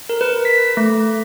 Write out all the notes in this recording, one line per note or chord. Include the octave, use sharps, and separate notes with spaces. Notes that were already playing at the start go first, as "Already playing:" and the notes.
A#4
B4
B6
A3